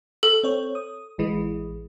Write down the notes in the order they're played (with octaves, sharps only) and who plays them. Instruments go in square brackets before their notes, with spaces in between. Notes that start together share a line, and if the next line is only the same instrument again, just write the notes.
[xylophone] A4
[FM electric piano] C4 C#5
D#6
A1 E3 G#3